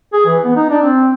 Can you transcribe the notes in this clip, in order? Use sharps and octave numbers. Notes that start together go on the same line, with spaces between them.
G#4
E3
B3
D#4
D4
C4